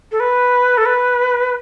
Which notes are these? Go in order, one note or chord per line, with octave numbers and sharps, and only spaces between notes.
A4
B4
A4
B4